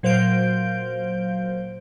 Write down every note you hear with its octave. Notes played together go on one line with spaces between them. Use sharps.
A#2 F#3 C5 F5 G6 D7